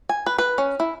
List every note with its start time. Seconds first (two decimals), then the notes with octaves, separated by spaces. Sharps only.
0.09 G#5
0.26 B4
0.38 B4
0.58 C#4
0.80 E4